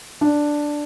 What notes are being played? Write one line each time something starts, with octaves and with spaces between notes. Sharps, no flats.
D4